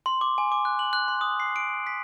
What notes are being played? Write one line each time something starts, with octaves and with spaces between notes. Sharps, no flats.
C6
D6
G#5
D6
F#6
F#7
F#6
C6
D#6
C7
D7
B6